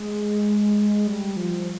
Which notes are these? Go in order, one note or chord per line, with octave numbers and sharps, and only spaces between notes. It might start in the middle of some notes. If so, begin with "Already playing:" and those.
Already playing: G#3
G3
F3